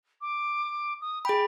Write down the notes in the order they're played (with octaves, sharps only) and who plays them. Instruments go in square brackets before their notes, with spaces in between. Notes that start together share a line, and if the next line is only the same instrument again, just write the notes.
[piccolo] D6
D#6
[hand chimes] G#4 B5 [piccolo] G5